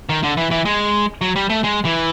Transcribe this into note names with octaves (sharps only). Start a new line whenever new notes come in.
D#3
D3
E3
E3
G#3
F#3
G3
A3
G#3
E3